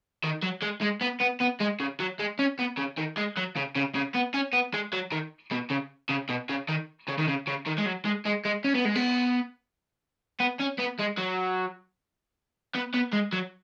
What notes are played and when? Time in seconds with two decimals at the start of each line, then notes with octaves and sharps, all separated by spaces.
0.24 D#3
0.43 F#3
0.63 G#3
0.82 G#3
1.02 B3
1.21 B3
1.41 B3
1.61 G#3
1.80 C#3
2.00 F#3
2.20 G#3
2.39 C#4
2.59 B3
2.77 C#3
2.98 D#3
3.17 G#3
3.37 F#3
3.56 C#3
3.75 C#3
3.95 C#3
4.15 B3
4.34 C#4
4.53 B3
4.74 G#3
4.93 F#3
5.12 D#3
5.52 B2
5.71 C#3
6.10 C#3
6.30 B2
6.49 C#3
6.68 D#3
7.08 C#3
7.18 D#3
7.27 C#3
7.47 C#3
7.66 D#3
7.78 G#3
7.86 F#3
8.05 G#3
8.25 G#3
8.45 G#3
8.64 C#4
8.75 B3
8.85 G#3
8.95 B3
10.40 B3
10.59 C#4
10.78 B3
10.99 G#3
11.17 F#3
12.75 B3
12.94 B3
13.13 G#3
13.33 F#3